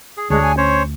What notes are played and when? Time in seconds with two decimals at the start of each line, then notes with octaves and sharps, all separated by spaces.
0.17 G#4
0.30 D2 G#3 D4 G#4 C#5
0.42 G#5
0.57 C#4 C5 C#5